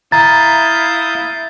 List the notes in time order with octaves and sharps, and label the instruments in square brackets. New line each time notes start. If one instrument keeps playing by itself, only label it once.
[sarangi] E4 [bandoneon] F5 D#6 G6 [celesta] A#5 [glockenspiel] A6